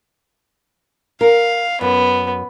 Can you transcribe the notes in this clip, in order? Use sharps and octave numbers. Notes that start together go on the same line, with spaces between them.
A#4 F5
F#2 B3